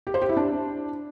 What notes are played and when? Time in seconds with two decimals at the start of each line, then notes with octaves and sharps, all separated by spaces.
0.07 G4
0.14 C5
0.22 G4
0.29 E4
0.37 D4